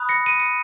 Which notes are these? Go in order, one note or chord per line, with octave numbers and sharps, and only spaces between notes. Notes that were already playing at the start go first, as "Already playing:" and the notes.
Already playing: B5 D#6 F#6
A#6 C#7
D#7
C#7